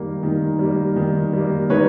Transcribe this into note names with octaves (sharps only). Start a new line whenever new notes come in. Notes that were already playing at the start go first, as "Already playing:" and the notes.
Already playing: D#3 G3 A#3
D#3
G3 A#3
D#3
G3 A#3
D#3 B4 C#5